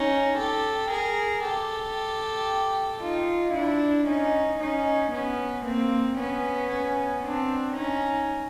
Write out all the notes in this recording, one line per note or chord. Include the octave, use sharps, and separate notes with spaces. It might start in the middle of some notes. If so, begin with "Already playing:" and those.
Already playing: C#4 D#4
G4 A4
G#4 A#4
G4 A4
D#4 F4
D4 E4
C#4 D#4
C#4 D#4
B3 C#4
A#3 C4
B3 C#4
C4 D4
C#4 D#4